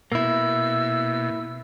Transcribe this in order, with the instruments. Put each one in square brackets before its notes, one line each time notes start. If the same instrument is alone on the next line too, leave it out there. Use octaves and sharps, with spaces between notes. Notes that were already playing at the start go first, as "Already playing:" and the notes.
[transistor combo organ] B2 [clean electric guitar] A#3 E4 [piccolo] E6